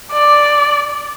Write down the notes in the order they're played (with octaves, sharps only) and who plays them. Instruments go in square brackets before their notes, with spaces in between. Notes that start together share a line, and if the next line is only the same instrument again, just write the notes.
[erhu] D5